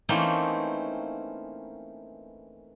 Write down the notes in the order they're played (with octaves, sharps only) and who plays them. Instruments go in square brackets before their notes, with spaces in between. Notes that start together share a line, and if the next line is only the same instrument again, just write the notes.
[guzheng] E3 A3 A#3 C4 C#4 D#4